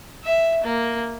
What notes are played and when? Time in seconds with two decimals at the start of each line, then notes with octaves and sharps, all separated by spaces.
0.24 E5
0.64 A#3